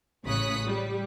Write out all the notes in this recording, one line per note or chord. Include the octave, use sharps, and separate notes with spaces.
A1 C#3 C#5 D#6 F#6 B6
G3